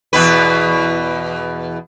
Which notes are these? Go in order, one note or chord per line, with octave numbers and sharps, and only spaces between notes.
E2 B2 B4